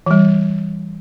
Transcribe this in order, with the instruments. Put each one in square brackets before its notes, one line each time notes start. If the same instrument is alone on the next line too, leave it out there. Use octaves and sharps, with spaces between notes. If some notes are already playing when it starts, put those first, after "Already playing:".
[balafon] E3 G3